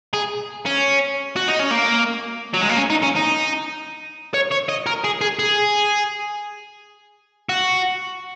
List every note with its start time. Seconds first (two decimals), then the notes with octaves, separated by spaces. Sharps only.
0.14 G#4
0.66 C#4
1.36 F#4
1.48 D#4
1.59 C#4
1.71 A#3
2.54 F#3
2.61 G#3
2.69 A#3
2.76 C#4
2.90 D#4
3.03 C#4
3.16 D#4
4.34 C#5
4.52 C#5
4.69 D#5
4.87 A#4
5.04 G#4
5.21 G#4
5.39 G#4
7.49 F#4